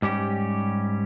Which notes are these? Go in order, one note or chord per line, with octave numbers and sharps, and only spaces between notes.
G#2 G3 C#4 G4